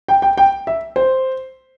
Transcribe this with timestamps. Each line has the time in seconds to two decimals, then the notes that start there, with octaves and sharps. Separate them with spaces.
0.08 G5
0.22 G5
0.38 G5
0.67 E5
0.96 C5